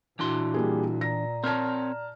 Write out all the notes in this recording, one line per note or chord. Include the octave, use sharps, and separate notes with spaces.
A#2 E3 D4 E4 F#4 C6
G3 A#3 G#4
D5 A#5 A#6
C4 A#4 C#5 A5 F6